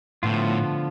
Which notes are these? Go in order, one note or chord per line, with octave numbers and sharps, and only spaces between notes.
A2 D3 F3 B3 F4